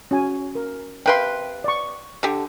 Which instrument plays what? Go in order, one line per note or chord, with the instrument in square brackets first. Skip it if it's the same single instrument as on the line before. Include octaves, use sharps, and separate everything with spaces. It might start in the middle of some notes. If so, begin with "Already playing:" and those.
[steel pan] C#4 F#4 G#5
A#4
[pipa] C3 B4 C6 [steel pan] F5 G5
[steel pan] D5 C#6
[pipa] D3 G4